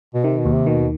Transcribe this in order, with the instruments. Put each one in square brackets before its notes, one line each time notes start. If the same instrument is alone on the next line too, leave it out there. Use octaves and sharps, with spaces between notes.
[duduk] B2
[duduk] C3 [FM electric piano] D#3
[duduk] B2
[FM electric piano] D#2
[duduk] C3
[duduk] B2 [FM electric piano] D#3